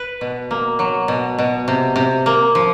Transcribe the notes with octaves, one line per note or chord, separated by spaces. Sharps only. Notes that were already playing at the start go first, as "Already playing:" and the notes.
Already playing: B4
B2
A#3
F#3
B2
B2
C3
C3
A#3
F3